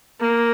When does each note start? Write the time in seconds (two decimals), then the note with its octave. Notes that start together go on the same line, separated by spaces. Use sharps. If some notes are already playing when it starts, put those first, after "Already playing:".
0.20 A#3